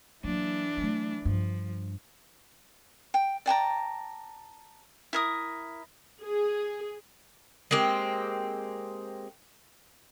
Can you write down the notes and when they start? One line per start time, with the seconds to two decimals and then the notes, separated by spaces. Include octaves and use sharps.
0.24 E3 F#3 A#3 D4
0.77 F#3 A3
1.25 G2 F3
3.14 G5
3.46 D5 G5 A5 A#5
5.13 E4 A#4 D#6
6.22 G#4
7.71 G#3 A#3 C4 G4